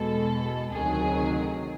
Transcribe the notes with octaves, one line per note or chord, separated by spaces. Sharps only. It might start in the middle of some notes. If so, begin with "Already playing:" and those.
Already playing: E2 B2 G#3 A4
D2 C3 D#3 F#3 G#4